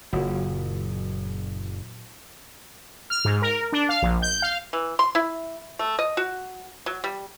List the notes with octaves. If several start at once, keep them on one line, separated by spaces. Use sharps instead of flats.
F#1 A#2 F#3
F6
G#2
A#4
D4
F5
A#1
G6
F5
E3
C6
E4
A3
D#5
F#4
F#3
G3